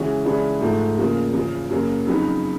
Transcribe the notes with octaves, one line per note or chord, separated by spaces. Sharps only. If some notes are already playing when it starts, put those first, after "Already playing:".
Already playing: C#3 E3 G#3 C#4 F#4
C#3 E3 G#3 B3 D4
G#2 F3 A3
E2 C#3 F3 A#3
E2 C#3 F3
F#2 C#3 F#3 A#3
F2 C#3 F#3 B3 D#4